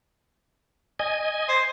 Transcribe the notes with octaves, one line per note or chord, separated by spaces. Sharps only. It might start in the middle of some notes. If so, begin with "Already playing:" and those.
D#5 G#5
C5